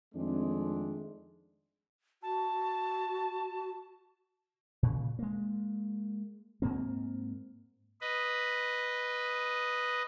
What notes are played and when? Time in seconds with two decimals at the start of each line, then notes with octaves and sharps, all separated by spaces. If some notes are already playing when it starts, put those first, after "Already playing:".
0.14 F2 D#3 G#3 A3 C4 D4
2.23 F#4 A5
4.83 A#2 C#3
5.19 G#3 A#3
6.62 G#2 A#3 C4
8.01 B4 D#5